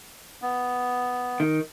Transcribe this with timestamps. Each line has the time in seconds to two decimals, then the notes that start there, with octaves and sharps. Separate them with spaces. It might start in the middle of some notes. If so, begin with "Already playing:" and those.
0.42 B3
1.40 D#3